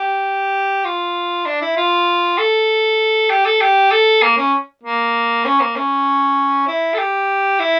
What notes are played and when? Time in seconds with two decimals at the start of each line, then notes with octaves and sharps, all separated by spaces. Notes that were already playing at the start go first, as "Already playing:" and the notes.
Already playing: G4
0.85 F4
1.46 D4
1.61 E4
1.77 F4
2.38 A4
3.30 G4
3.46 A4
3.61 G4
3.91 A4
4.22 A#3
4.38 C#4
4.83 A#3
5.45 C#4
5.60 A#3
5.76 C#4
6.68 E4
6.94 A4
6.99 G4
7.60 E4